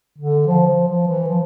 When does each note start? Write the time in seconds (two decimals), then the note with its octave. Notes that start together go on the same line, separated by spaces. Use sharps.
0.18 D3
0.47 F3
0.67 F3
0.88 F3
1.08 E3
1.28 F3